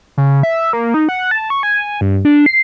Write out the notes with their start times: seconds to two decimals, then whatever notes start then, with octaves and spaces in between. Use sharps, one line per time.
0.17 C#3
0.43 E5
0.73 A#3
0.94 D#4
1.09 F#5
1.31 A5
1.50 C#6
1.63 G#5
2.01 G2
2.25 D4
2.46 C7